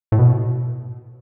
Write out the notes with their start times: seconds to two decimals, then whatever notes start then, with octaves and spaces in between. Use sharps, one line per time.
0.12 A2
0.19 B2